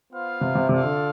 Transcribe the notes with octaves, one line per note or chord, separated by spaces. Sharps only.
B3 F4 C5 F5
C3
C3
C3 F4 A4 D5 F5
D3